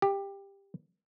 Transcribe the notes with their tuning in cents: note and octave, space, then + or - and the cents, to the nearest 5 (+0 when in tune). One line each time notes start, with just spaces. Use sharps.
G4 +15